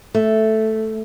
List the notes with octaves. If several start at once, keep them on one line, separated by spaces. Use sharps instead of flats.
A3